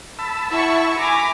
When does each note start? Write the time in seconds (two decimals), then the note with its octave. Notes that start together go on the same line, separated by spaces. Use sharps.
0.19 A5 B5 E6
0.50 E4 E5 F#5 C#6
0.97 G#5 A#5 B5 D6